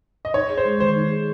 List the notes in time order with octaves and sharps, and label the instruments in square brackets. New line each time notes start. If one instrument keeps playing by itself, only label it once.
[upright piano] D#5
[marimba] D#4 [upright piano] C#5
[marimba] G#4
[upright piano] C5
[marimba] G#3
[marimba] D#3 [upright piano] C5
[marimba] D#4
G#4